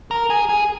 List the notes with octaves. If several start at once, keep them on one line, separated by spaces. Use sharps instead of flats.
A#4
G#4
G#4